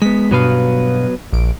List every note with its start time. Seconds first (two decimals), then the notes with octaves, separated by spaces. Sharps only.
0.02 G#3 B3 B6
0.31 G2 B2 F#3 B3 B4 F5
1.33 A#1 D7